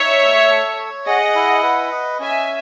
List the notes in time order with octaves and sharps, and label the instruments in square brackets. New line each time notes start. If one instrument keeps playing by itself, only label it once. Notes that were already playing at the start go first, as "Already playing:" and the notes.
Already playing: [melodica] D#4 [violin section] C#5 E5
[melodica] A3
A4
C#5
[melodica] G#4 [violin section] D#5 F#5
[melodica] E4
B4
D#5
[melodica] C#4 [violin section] E5 G#5